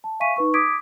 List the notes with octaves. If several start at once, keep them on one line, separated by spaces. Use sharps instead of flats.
A5
E5 F5 G#5 C#6 B6 D#7
D#4 B4 C#6
D6 D#6 G#6 B6 D7